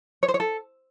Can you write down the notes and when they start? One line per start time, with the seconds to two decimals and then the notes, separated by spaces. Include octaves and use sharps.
0.23 C#5
0.28 C5
0.34 C#5
0.40 A4